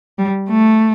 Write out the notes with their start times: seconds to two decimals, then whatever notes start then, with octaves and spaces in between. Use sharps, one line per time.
0.19 G3
0.49 A3